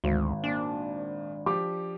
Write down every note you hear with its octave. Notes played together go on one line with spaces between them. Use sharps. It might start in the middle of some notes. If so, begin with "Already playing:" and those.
G#1 D2
A#2 D4
F3 G4 D6